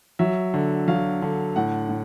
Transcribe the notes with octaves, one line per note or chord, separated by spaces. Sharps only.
F#3 E5
D3
F#3 F5
D3
A2 F#5
A2